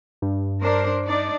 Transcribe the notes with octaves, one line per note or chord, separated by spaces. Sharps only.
G2
D4 A#4 C5
D4 D#4 D5